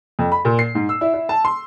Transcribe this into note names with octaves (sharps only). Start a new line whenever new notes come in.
F2
B5
A#2
C7
G#2
E6
E4
E4
A5
C6